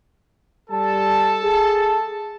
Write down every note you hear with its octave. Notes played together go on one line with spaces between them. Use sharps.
G3 A4 A5
G#4